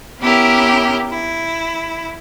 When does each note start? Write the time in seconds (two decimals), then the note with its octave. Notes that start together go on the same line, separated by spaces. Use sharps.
0.20 B3 C#4 E4 G4 A#4
1.10 E4